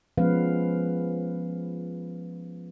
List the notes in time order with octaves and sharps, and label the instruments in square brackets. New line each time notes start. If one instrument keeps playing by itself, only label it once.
[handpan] F3 G#3 B3 C#4 B4 F5